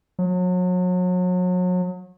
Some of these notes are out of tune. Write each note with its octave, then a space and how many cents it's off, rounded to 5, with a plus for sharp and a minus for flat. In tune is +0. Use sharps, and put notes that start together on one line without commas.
F#3 -35